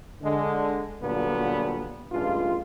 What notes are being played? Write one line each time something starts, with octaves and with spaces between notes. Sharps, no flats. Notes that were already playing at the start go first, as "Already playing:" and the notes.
D3 G#3
A#2 D3 F#3 G3 B3 F4
A1 G2 G#3 F4